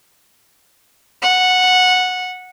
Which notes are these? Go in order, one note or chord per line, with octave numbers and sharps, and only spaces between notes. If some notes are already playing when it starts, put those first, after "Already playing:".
F#5